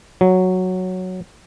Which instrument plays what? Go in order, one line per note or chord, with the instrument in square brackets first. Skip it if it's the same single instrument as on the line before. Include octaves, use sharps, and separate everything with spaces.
[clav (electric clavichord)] F#3